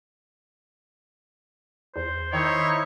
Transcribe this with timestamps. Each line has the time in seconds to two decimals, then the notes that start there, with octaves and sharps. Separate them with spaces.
1.96 E2 C5
2.33 D#3 D#4 E4 C#5